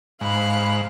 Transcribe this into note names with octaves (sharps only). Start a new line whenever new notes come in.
G#2 F5 B5 F#6